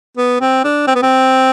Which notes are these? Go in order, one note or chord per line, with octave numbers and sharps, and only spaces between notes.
B3
C4
D4
C4
B3
C4